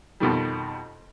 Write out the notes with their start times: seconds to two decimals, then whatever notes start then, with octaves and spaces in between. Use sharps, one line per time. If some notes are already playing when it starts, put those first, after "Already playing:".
0.20 F2 B2 D#3 G3